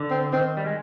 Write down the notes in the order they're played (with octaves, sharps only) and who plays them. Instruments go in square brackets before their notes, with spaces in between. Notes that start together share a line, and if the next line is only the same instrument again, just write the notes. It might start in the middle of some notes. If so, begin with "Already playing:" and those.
Already playing: [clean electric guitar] D3
[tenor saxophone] C4
[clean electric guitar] D#3 [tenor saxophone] C4
[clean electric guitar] G3
G#3